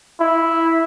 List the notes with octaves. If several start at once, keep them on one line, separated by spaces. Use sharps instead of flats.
E4